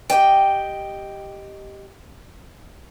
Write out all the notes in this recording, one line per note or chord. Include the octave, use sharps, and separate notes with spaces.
G4 D#5 G5